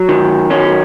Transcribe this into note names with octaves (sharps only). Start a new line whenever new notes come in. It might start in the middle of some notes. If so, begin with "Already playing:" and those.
Already playing: F#3
D#3
F#3 C#4